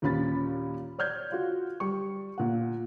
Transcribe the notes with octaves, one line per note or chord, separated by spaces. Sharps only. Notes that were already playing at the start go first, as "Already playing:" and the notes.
D#2 A#2 C#4 B5 A6
C#5 D5 F6 G6 G#6
F4 F#4
G3 C#6
A#2 F#5